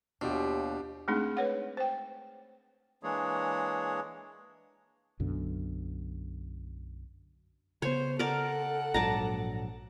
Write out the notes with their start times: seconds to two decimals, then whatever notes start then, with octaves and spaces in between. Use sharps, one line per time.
0.21 D#2 B2 D4 F4 G4
1.08 G#3 A3 C4 D4 D#4 G#4
1.37 B4 C#5 F#5
1.77 C5 G5
3.03 E3 G#3 A#3 D4 G#4 C#5
5.20 B1 F#2 B2 D3
7.82 C#3 B3 C5 C#5
8.19 A4 A#4 D5 F#5
8.94 A#1 G#2 F#3 D5 A5 A#5